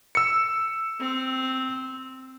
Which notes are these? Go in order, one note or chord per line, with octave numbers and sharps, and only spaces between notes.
E6 C#7
C4